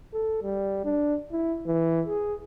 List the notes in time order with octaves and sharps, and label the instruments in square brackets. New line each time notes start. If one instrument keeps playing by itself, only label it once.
[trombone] A4
G3
D4
E4
E3
G#4